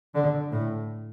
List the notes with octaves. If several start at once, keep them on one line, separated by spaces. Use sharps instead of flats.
D3
A2